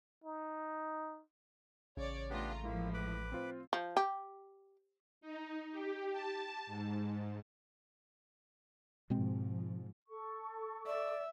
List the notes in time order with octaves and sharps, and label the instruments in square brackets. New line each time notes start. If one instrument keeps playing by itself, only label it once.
[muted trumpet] D#4
[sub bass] A1 [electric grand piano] C#3 [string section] C#5 D5
[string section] A3 F4 A#5 [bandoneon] B3 D4 G4
[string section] A2 F3 [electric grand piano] G#3 E4 [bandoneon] A#3
[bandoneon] B4 B5 D6
[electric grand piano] C4 F4 C5
[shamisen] F3
G4
[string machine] D#4
G4
A5
G#2
[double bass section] G#2 F3 [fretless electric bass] B2 G#3 C4
[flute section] A4 C#6
[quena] D5 [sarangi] E5